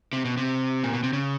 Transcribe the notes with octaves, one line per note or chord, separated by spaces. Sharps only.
C3
B2
C3
A#2
B2
C3
C#3